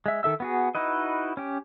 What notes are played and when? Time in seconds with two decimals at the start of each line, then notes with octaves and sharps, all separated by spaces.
0.06 G#3 E5
0.23 D#3 A4 E5 E6
0.40 B3 F#4 G#4
0.75 D#4 E4 F#4 B4 D#5
1.37 C#4 G4